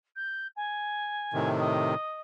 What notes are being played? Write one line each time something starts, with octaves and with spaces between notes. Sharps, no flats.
G6
G#5
A2 C3 D#3
D#5